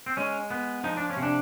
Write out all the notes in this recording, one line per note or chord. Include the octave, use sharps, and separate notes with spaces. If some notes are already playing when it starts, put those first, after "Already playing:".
C4
G#3 C#4
B3
F3 D#4
D4
C#4
C3
D4